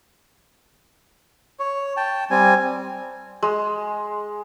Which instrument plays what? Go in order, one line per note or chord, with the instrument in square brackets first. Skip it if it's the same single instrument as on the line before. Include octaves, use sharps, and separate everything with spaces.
[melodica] C#5
G5 A5
G3 C4 G#5
[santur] G#3